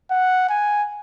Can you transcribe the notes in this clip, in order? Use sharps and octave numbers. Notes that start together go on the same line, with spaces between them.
F#5
G#5